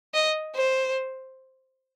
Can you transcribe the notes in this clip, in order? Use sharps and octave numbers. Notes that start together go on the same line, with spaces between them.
D#5
C5